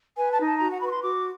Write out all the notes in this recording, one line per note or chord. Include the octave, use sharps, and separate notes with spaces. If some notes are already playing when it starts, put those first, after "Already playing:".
B4 G#5
A5
D#4
A5
F#4 A#5
F#5
B4 B5
C#6
C6
F#4 D6